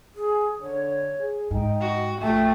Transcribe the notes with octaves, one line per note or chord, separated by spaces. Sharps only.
G#4
D3 C#5
G#4
G#2 D#4 G5
F#4
A#1 A3 F4 G5